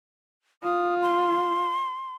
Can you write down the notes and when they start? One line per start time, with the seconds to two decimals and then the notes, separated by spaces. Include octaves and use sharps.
0.63 F4 D#6
1.02 C6